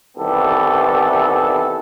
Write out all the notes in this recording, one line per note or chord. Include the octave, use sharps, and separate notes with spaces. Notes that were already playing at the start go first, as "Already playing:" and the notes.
C2 D#3 E3 B3 G4 A4